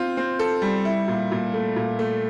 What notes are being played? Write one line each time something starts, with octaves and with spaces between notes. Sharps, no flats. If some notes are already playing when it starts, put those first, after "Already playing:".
Already playing: C4 F4
C4
A4
G3
E4
A#2
A#2
A3
A#2
A3